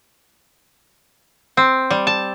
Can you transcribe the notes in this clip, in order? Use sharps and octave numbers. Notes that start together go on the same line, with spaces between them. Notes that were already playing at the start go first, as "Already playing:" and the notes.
C4
G3
A5